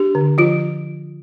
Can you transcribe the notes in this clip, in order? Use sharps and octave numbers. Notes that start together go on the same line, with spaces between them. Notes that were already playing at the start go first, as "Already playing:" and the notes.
Already playing: D4 G4
D3
F3 F4